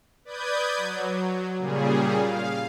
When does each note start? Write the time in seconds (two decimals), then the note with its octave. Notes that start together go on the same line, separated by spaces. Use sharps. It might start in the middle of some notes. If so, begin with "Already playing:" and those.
0.25 B4 D5 D#6 G6 G#6
0.77 F#3
1.57 A#2 C#3 G3 G#4
2.18 F5